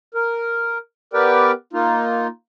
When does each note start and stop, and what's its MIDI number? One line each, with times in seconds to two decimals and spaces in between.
0.14 0.78 70
1.13 1.52 59
1.13 1.52 67
1.13 1.52 70
1.13 1.52 71
1.13 1.52 74
1.13 1.52 79
1.73 2.27 58
1.73 2.27 63
1.73 2.27 65